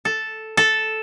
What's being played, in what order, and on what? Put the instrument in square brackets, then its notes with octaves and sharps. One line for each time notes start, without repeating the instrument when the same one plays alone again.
[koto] A4
A4